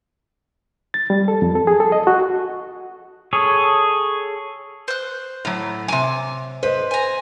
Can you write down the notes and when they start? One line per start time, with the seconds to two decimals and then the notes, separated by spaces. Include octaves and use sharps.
0.94 A6
1.10 G3
1.28 A4
1.42 F2
1.55 A4
1.67 G#4
1.80 A4
1.92 D#5
2.07 F#4
3.33 G#4 A4 C#5
4.88 C5 F#6
5.45 A2 F#3
5.88 C3 G#5 D6
6.63 B4 C5 D#5
6.91 G#5 A#5